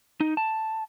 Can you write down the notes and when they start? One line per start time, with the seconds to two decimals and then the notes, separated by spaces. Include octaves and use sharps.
0.20 D#4
0.37 A5